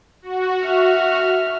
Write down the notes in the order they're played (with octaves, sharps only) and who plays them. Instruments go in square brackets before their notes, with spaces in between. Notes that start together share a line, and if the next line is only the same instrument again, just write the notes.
[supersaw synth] F#4
[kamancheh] E5 F6